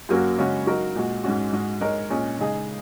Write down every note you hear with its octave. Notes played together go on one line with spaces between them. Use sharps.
F#2 F#3 A#3 C#4 F#4
C#3 G#3 C#4 F#4 C#5
F#3 D#4 F#4 A#4
A#2 G#3 F#4
G#2 G#3 C#4 F#4
G#2 G#3 F#4 D#5
G#3 D#4 A#4 C#5
A#2 G#3 C#4 G#4 C#5
C#3 G#3 D#4 G#4